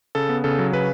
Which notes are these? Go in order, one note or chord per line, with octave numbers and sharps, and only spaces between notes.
C#3 A4
B3
C#3 A4
F#3
C#3 B4